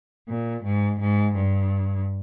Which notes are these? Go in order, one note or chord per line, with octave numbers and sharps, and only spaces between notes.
A#2
G#2
G#2
G2